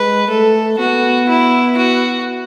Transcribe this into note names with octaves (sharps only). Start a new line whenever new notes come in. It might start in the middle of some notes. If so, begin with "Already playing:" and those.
Already playing: G#3 B4
A3 A4
B3 F#4
E4
F#4